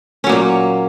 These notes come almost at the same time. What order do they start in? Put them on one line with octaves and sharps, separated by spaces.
C#4 F#3 A#3 A#2